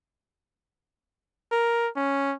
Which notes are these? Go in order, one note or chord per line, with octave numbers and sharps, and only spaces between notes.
A#4
C#4